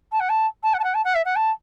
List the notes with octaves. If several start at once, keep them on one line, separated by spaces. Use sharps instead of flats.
A5
F#5
A5
A5
F#5
A5
F#5
A5
F#5
E5
F#5
A5